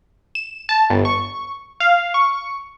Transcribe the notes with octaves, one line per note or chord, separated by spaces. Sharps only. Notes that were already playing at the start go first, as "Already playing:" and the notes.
E7
A5
G1
C#6
F5
C#6